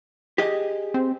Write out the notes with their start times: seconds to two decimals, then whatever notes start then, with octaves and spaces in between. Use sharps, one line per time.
0.38 G4 G#4 D#5
0.94 C4